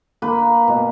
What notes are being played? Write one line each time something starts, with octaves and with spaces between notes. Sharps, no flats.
A#3 B4
B2